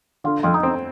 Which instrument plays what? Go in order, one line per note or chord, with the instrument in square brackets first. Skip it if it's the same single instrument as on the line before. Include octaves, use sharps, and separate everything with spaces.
[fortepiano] D3 [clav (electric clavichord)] F4
[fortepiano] F2 [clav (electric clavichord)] F4
[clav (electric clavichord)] D#4
[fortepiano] C4